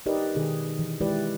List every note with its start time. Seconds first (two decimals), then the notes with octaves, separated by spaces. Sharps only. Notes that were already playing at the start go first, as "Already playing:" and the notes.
0.06 D#4 G4 A#4 B4 D5 D#5
0.35 B2 D#3 G#4
0.79 E3
1.00 E3 G#3 E4 G4 B4 D5